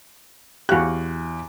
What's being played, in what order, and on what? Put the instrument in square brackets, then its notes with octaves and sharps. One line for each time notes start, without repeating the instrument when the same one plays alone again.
[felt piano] E2 F5 F#6 [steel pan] F#4 G4